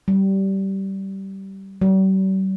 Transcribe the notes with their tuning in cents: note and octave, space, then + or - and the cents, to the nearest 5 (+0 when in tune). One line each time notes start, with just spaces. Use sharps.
G3 -20
G3 -45